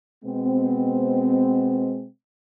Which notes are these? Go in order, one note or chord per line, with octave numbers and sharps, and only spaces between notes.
B2 G#3 B3 C4